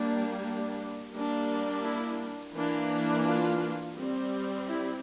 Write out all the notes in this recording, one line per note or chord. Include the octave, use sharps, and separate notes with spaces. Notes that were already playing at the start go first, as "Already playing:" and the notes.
Already playing: G3 A#3 D4
D4
G3 A#3 D4
E4
E3 A#3 D4
F4
G3 C4
E4